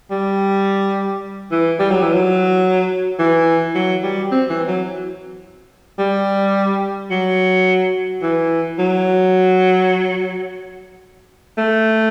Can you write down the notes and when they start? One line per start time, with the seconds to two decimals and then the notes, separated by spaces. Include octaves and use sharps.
0.11 G3
1.52 E3
1.79 G3
1.91 F#3
2.03 E3
2.14 F#3
3.19 E3
3.75 F#3
4.03 G3
4.32 C4
4.50 E3
4.68 F#3
5.99 G3
7.11 F#3
8.23 E3
8.79 F#3
11.58 A3